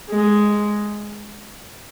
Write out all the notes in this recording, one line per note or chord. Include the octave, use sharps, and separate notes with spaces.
G#3